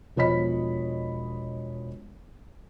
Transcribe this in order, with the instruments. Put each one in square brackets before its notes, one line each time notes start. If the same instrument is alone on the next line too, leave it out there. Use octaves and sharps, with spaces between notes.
[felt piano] E1 F3 C#5 D#5 B5 B6